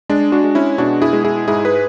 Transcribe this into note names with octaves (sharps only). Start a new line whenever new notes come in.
G#3 D4
D4 F#4
G#3
C#4 E4
B2 D4 F#4
E4 G#4
G#3
E4 G#4
G#2 E4 G#4
G#4 B4